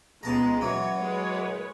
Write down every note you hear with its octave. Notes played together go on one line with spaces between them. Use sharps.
C#2 G#3 B3 A5 A#5
E3 F#3 C#5
G#3 B4 C#5